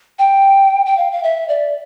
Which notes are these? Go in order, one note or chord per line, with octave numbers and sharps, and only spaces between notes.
G5
G5
F5
F5
E5
D5